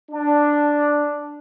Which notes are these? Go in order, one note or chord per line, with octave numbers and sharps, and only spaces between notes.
D4